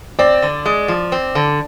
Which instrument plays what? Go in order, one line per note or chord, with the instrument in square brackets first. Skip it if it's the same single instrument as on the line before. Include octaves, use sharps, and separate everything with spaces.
[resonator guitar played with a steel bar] C4 [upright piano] D5
[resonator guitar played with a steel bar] D3
G#3
F3
C4
D3